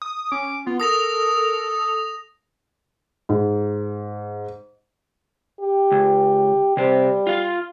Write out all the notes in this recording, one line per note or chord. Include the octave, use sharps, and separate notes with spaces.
D#6
C#4 D6
B3 F4
A4 A#4 D#6 A#6 F7
G#2
G4
C#2
C3 G3 C5
F4 F5